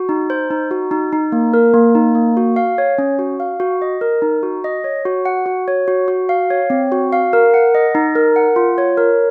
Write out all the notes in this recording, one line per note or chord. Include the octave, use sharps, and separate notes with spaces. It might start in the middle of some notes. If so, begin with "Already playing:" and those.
Already playing: F#4
D#4
C5
D#4
F#4
D#4
D#4
A#3
A#4
A#3
D#4
A#3
F#4
F5
C#5
C#4
F#4
F5
F#4
D#5
A#4
D#4
F#4
D#5
C#5
F#4
F#5
F#4
C#5
F#4
F#4
F5
C#5
C4
F#4
F5
A#4
F#5
D#5
D#4
A#4
F#5
F4
C#5
A#4